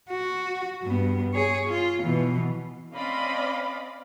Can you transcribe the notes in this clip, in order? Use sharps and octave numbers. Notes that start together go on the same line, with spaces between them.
F#4
G2 B3
G#4 C#5
F4
B2 E3
C4 C#4 D5 D#5 F5 B5